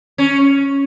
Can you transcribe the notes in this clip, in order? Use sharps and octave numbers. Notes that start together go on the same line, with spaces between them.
C#4